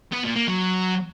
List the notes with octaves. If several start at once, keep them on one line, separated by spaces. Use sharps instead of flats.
B3
A#2
A#3
F#3